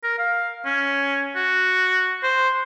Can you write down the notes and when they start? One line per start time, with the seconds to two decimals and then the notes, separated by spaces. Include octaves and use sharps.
0.04 A#4
0.18 F5
0.65 C#4
1.36 F#4
2.23 C5